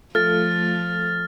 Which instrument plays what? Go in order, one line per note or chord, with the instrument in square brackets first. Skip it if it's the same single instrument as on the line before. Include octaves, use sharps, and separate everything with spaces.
[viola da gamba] F3 [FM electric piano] A3 F4 A4 [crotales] F6 A6